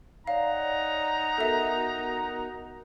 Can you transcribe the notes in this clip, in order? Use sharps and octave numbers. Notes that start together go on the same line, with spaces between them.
D#4 C#5 D5 F5 F#5 A#5
B3 F#4 A4 A#4 E5